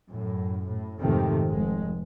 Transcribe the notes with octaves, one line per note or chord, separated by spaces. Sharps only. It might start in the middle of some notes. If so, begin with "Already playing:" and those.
F#2 A2
A2
F2 G#2 C3 D#3 A3
F1 G#3